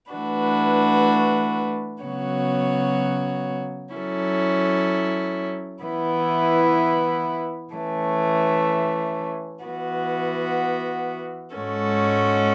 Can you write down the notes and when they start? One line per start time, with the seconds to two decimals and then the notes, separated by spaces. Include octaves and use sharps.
0.11 E3 A3 D4 F#4 B4
2.03 C#3 F#3 B3 F#4 C#5
3.92 F#3 C#4 E4 A4
5.83 E3 B3 E4
7.73 E3 A3 C#4
9.64 E3 B3 F#4
11.54 G#2 G#3 C#4 F#4 A4